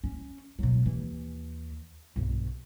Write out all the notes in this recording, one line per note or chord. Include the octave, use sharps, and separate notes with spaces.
C#4
B2 F#3
D#2 E3
B1 G2